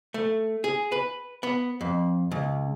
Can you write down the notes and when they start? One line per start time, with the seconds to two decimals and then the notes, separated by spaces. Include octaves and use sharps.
0.14 A3
0.64 G#4
0.92 B4
1.43 B3
1.81 F2
2.31 C#2